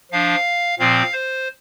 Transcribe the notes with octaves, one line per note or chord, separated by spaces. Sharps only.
F3 D4 F5
A#2 F3 C4 F5
C5